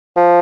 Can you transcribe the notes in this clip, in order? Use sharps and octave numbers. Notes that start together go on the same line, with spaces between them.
F3